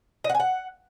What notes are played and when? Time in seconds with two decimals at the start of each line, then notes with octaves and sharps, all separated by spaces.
0.24 D#5
0.29 F#5
0.35 G#5
0.40 F#5